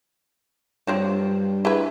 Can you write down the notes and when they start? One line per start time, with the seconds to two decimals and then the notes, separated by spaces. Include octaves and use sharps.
0.87 G2 F3 F#3 C4
1.65 E4 G#4 B4